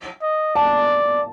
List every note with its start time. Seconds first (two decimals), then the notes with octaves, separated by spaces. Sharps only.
0.22 D#5
0.55 D5 A5